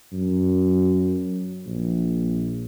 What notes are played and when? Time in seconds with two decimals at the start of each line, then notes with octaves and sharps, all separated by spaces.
0.13 F#2
1.67 A#1